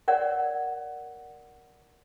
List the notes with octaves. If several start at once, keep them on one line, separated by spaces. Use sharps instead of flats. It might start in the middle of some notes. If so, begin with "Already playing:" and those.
A#4 C#5 D5 F#5